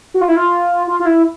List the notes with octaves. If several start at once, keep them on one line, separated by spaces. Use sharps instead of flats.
F#4
F4
E4
F4
F4
F4
E4